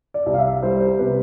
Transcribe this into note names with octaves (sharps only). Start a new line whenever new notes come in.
D5
C2
F5
E5
G3 C5
C5
C3 B4